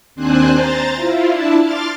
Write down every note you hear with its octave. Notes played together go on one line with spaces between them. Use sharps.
D#2 C4 D4 C5 G#5 F#6
C5 A#5 A6
E4 F4
D4 E4 A5
C6 D6 F6 A6